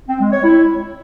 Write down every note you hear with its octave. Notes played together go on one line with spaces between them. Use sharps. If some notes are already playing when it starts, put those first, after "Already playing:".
C4
G#3
C#5
E4